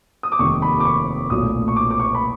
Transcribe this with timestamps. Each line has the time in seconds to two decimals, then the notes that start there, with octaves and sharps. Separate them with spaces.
0.23 D#6
0.32 D6
0.39 F1 D#2 D#3 G3 C#6
0.62 B5
0.80 D6
0.85 C#6
1.30 B1 A#2 F#3 A3 D#6
1.68 C#6
1.76 D6
1.90 D6
2.00 C#6
2.15 B5